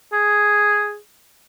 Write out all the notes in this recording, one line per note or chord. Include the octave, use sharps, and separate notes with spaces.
G#4